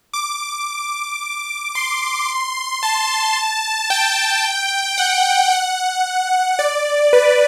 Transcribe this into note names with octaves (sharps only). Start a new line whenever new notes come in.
D6
C6
A5
G5
F#5
F#5
D5
B4